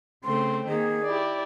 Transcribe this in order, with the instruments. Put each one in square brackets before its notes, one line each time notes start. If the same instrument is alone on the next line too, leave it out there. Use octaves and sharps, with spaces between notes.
[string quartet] C#3 A3 C4 [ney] C6
[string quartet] D#3 A#3 [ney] G#4
[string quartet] E4 G4 D5